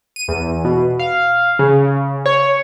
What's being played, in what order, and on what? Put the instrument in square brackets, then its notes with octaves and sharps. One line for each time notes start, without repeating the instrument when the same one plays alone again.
[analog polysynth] D#7
E2
B2
F5
C#3
C#5